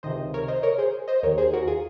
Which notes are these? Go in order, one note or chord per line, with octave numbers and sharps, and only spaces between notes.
C#2 C3 D#3 C5 D#5
A#4 C#5
C5 D#5
A#4 C#5
G#4 C5
C5 D#5
D#2 D#3 A#4 C#5
G#4 C5
F#4 A#4
F4 G#4